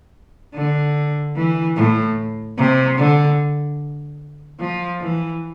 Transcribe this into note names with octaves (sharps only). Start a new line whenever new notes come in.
D3
E3
A2
C3
D3
F3
E3